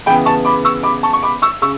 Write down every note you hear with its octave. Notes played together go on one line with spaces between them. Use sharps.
C#3 E3 B3 G5 B5
A5 C#6
B5 D6
C#6 E6
B5 D6
A5 C#6
C#6
B5 D6
C#6 E6
C#3 C#6 E6